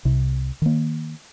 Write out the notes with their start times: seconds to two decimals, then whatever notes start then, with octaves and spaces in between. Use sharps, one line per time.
0.05 C2 C3
0.62 D#3 A#3